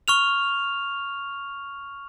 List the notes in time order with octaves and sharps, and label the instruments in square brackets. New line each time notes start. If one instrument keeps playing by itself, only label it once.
[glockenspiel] C#6 F6 F7